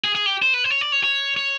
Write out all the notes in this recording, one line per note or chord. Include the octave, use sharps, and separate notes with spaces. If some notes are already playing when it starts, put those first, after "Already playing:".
G#4
G#4
G4
C5
B4
C5
C#5
D5
C#5
C#5
C#5